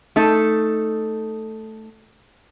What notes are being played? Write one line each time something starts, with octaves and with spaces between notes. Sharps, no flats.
A3 D#4 A4